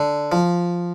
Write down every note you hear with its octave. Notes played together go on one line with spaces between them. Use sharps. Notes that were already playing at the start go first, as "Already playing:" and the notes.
Already playing: D3
F3